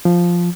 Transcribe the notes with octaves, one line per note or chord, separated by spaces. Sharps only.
F3